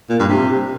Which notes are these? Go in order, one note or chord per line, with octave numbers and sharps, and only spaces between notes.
A#2
G2
C3